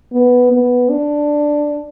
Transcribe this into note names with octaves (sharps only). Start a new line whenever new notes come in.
B3
B3
D4